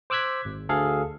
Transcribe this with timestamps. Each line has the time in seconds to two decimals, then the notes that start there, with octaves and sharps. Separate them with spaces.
0.10 C5 D6 E6 F#6 G#6 B6
0.45 G#1
0.69 D2 G#4 A4 F5